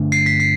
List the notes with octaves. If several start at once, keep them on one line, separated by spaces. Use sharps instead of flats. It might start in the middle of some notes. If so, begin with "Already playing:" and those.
Already playing: G2 D3 A3 D4
C7
B6
C7